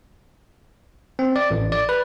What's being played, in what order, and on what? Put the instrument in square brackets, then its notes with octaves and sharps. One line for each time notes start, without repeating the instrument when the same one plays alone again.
[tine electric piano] C4
D5
A1
D5
B4